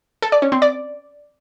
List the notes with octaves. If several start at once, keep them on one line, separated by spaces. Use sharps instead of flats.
A4
D5
C#4
C4
D5